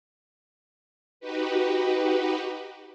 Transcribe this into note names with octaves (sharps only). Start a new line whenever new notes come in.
D#4 F#4 G4 B4